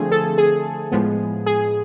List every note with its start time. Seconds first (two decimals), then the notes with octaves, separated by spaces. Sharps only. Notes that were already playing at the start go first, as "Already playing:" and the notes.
Already playing: D3 F3 A3 C4 G#4
0.11 A4
0.38 G#4
0.92 A2 F3 G#3 B3
1.46 G#4